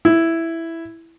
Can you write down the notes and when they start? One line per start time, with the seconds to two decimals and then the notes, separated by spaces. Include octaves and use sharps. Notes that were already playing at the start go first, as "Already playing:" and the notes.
0.05 E4